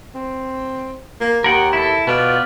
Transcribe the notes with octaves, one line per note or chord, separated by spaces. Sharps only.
C4
A#3
D#2 A#4 F#5 G5
E4 A4
B2 B3 F4 D5